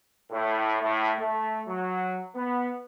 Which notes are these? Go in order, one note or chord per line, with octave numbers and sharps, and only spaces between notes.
A2
A2
A3
F#3
B3